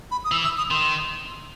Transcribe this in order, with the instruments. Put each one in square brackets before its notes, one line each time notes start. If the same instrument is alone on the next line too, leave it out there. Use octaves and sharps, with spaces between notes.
[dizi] B5
D#6
[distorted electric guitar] E3 [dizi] E6
[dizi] E6
D#6
[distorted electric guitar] D#3 [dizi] C6